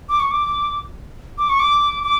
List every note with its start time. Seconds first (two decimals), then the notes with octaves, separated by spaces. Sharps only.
0.09 D6
0.20 C#6
0.31 D6
1.38 D6
1.49 C#6
1.60 D6
2.04 D6